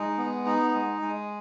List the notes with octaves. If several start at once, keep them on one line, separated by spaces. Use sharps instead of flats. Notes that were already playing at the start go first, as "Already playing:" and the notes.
Already playing: G#3 D#4
B3
D#4
G#3
G#3